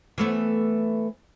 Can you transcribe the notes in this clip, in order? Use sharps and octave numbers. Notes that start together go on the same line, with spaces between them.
E3 A3 B3